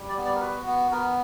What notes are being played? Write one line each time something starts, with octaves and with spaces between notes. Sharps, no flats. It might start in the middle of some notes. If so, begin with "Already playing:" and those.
Already playing: G3
D5
B3
D5
A#4
F#4 B4
B3
B3 A#4